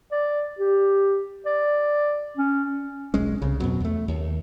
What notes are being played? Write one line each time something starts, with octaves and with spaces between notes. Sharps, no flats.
D5
G4
D5
C#4
D#1 B1 G#3 C#4
C2 C#3
F2 B2 F#3
E2 A3
D#2